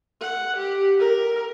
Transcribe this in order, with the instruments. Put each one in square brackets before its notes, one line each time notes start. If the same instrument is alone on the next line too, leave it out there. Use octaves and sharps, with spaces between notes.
[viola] F#5
G4
A#4